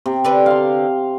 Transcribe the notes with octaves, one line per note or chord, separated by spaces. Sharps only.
C3
D3 D4 B4
F5 C6